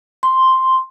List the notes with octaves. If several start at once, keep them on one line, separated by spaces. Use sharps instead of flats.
C6